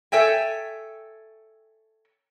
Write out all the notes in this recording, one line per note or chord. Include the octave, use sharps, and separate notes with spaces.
A4 C#5 E5 G5 G#5